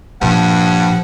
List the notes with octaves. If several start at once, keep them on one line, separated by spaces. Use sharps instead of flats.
G2 A#2 F3 F#5